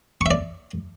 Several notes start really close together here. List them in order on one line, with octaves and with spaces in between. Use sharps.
C#6 E5 D5